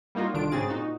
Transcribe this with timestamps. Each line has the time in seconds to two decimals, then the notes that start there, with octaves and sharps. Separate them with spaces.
0.15 G3 A#3 D#4 F4 F#4
0.34 C2 D3 D#3 D4 F4 D7
0.51 G#2 C#3 C4 F#4 G#4 A6
0.69 A#2 D#4 F#4